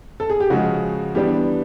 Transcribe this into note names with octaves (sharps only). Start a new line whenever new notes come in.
A4
G#4
G4
C#3 F3 G#3 F#4
E3 G3 B3 D4 G4